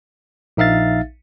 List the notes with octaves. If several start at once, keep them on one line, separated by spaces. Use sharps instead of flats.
A#1 D#4 E5 F5 A6